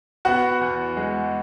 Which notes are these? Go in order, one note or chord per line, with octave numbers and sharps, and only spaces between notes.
B3 F#4 F#5
E2
G#3